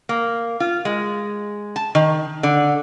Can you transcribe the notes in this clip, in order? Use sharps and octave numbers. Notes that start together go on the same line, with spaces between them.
A#3
F4
G#3
A5
D#3
D3